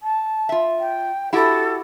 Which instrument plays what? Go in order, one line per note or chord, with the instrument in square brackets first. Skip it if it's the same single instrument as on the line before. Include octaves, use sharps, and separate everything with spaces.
[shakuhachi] A5
[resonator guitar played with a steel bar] F4 E5
[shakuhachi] G5
[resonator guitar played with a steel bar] E4 F#4 G4 [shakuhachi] A4